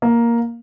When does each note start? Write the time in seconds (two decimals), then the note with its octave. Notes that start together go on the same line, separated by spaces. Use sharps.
0.02 A#3